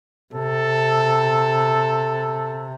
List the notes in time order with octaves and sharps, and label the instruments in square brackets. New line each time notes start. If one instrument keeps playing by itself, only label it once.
[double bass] C3 [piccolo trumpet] A4